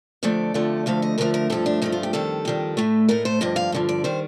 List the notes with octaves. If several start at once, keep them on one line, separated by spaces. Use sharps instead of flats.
F2 D3 F3 A3 D5
F2 D3 F3 A3
D2 D3 F3 A3 F5
D#5
D2 D3 F3 A3 A#4
A#4
G2 F3 A3 A4
D4
G2 F3 A3 D#4
F4
G4
F2 D#3 G3 A4
F2 D#3 G3
A2 A3
A2 A3 A#4
C5
G2 D3 F3 D#5
F5
G2 D3 F3
D5
D#3 G3 C5